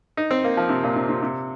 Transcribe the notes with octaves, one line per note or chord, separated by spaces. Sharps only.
D#4
C4
A#3
F3
C3
A#2
C3
C3
C3